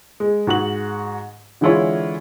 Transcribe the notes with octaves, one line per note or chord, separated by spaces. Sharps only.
G#3
G#2 F#4 F#7
D3 E3 G#3 E4 F4 C#5